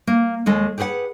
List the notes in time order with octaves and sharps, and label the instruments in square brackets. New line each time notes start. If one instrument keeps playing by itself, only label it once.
[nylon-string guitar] A#3
D#2 G#3 A4 D#5
G4 G#4 B4 C5 F#5